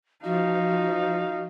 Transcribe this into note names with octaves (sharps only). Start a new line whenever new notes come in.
F3 D#4 F#4 F5